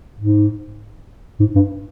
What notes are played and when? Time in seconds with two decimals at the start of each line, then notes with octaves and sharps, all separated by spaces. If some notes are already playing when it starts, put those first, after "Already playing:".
0.20 G#2
1.40 G#2
1.55 G2